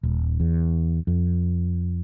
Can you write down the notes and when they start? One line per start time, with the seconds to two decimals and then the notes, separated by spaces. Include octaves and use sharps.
0.03 D#1
0.40 E2
1.07 F2